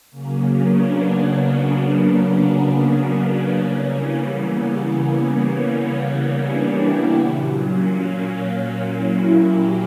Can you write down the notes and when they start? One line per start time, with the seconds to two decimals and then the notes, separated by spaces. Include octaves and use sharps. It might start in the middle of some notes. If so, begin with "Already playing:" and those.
0.11 C#3 F#3 A#3 C#4
0.55 B3 D4
2.74 B3 D4
3.17 A#3 C#4
3.61 C#3 E3 G3 A#3 C#4
4.05 B3
4.49 B3
4.78 A#3 C#4
5.07 A#3 C#4
5.36 B3
5.80 A#3 C#4
6.24 B3 D4
6.53 E4 G4
6.82 D4 F#4
7.12 A#2 F#3
7.55 A#3 C#4
8.43 A#3 C#4
8.87 C#4 E4
9.30 E4 G4